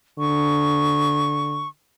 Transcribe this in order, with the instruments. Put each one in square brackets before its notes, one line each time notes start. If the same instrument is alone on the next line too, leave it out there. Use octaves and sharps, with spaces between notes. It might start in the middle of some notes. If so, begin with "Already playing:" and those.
[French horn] D3 [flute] C#6